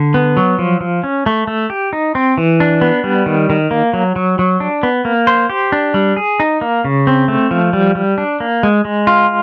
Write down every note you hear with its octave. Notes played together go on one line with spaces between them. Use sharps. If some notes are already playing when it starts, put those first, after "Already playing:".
Already playing: D3
B3
F#3
F3
F3
C#4
A3
A3
G4
D#4
C4
E3
D4
B3
G3
D#3
D#3
A#3
F#3
F#3
F#3
D4
B3
A#3
C5
G4
D4
G3
G#4
D#4
A#3
C#3
C4
A3
F3
G3
G3
D4
A#3
G#3
G#3
F4